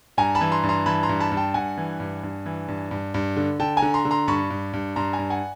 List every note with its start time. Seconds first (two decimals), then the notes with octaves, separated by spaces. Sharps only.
0.17 G2 G#5 A#5
0.35 A5 B5
0.41 E3
0.52 A#5 C6
0.63 G2
0.69 A#5 C6
0.86 E3 A5 B5
1.03 A#5 C6
1.09 G2
1.20 A5 B5
1.31 G2
1.37 G5 A5
1.54 G2 F#5 G#5
1.77 E3
2.00 G2
2.23 G2
2.46 E3
2.68 G2
2.91 G2
3.14 G2
3.36 D3
3.59 D3 G5 A5
3.77 G#5 A#5
3.82 D3
3.94 A#5 C6
4.05 D3
4.11 A#5 C6
4.28 G2 B5 C#6
4.50 G2
4.73 G2
4.96 G2 A#5 C6
5.13 G#5 A#5
5.19 G2
5.30 F#5 G#5